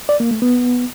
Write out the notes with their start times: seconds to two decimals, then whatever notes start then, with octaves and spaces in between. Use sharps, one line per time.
0.09 D5
0.20 A#3
0.31 A3
0.42 B3